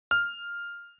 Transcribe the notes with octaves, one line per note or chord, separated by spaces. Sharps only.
F6